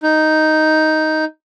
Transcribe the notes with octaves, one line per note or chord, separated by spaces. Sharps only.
D#4